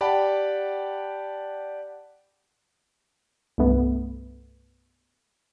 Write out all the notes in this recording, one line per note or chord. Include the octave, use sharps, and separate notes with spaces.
G4 D5 F#5 G5 A5 B5
C2 G2 A3 B3